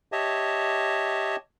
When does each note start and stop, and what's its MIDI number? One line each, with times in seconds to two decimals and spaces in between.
0.12 1.36 67
0.12 1.36 73
0.12 1.36 75
0.12 1.36 76
0.12 1.36 81